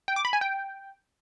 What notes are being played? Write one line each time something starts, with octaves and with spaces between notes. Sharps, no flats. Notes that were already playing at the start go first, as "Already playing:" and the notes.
G5
D6
B5
G#5
G5